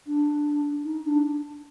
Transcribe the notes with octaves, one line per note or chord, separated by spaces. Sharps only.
D4
D#4
D4